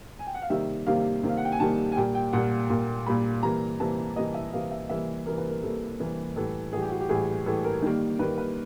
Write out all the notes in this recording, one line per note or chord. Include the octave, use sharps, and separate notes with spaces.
G#5
G5
F#5
F5
C3 D#3 G3 A#3 E5
C3 D#3 G3 A#3 F5
C3 D#3 G3 A#3
F5
F#5
G5
G#5
C3 D#3 G3 A#3 A5
G#5
A#2 G3 A#3 G5
G5
A#2 G3 A#3 F#5
A#2 G3 A#3
A#2 G3 A#3 B5
C3 E3 G3 A#3 A#5
C3 E3 G3 A#3 A5
C3 E3 G3 A#3 D#5
E5
C3 E3 G3 A#3 F5
E5
C3 E3 G3 A#3 E5
C3 E3 G3 A#3 A#4
B4
A#4
C3 E3 G3 A#3 A4
C3 E3 G3 A#3
A2 E3 G3 A4
A2 E3 G3 G#4
G4
F#4
G4
A2 E3 G3 G#4
A2 E3 G3 A4
A#4
D#3 G3 A#3
D#3 G3 A#3 B4
B4